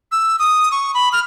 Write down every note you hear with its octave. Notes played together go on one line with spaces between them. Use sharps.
E6
D#6
C#6
B5
F6